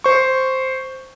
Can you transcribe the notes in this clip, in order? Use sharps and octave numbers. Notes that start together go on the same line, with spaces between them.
C5 C#6